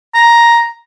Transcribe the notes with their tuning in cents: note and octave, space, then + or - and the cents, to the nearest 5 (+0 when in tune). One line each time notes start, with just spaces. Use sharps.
A#5 +5